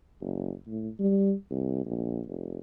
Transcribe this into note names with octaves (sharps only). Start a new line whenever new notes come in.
F#1
A2
G3
C2
A#1
F1